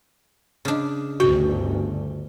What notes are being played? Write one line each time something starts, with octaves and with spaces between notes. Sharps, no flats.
C#3 D4
G1 D2 G2 F#4 G5